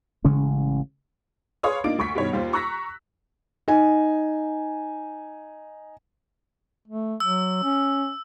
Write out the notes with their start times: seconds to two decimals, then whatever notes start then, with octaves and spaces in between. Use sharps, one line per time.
0.25 A1 C#3 G#3 C#4
1.63 G#4 B4 C#5 F5 C6 D#6
1.84 A#3 D4 D#4 F4 D6 D7
1.98 D2 C#6 B6
2.15 G2 B2 D#3 C#5
2.33 D#2 F4 C5
2.53 A#5 C#6 E6 F#6 A#6 B6
3.68 D#4 G#5
6.88 A3
7.20 F#3 E6
7.64 C#4